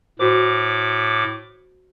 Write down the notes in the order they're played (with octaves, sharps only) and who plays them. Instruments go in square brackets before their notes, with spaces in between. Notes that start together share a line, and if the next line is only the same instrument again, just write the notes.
[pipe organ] A2 D6 [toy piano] F#4 C5